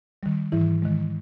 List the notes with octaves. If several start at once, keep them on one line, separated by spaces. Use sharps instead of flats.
D#3 G3
G#2 E3 E4
D#3 G#3